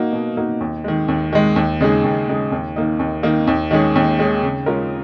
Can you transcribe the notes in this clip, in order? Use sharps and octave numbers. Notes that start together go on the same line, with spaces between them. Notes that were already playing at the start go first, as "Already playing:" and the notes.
Already playing: A#3 D#4 F#4
B2
A#3 D#4 F#4
D#2
D#3 G#3
D#2
D#3 G#3
D#2
C#3 G#3 D#4 G#4
D#2
C#3 G#3 D#4 G#4
D#2
D#3 A#3 D#4
D#2
D#3 A#3 D#4
D#2
D#3 G#3 C#4 G#4
D#2
D#3 G#3 C#4 G#4
C#3
G#3 C#4 F4 A#4